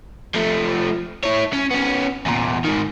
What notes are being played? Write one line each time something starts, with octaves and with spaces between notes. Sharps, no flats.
F3 A3
E4 C#5
C#4
B3 C#4
E2 A#2
G#2 D#3